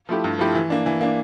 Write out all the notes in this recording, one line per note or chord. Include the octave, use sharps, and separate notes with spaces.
F3 A3 E4 G4
G2
F3 A3 E4 G4
E3
A#3 D4
E3
A#3 D4